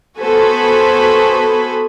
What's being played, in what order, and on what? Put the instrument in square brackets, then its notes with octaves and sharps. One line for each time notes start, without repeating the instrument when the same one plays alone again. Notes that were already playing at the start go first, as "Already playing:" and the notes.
[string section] B3 F#4 A4 C5 G#5 B5